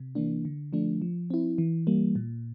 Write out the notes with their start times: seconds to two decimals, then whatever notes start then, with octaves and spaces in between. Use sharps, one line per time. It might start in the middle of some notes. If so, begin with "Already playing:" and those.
Already playing: C3
0.15 E3 A#3 D4
0.45 D3
0.73 F3 A3 D4
1.02 F3
1.30 C4 E4
1.58 E3
1.87 G3 A#3
2.15 A#2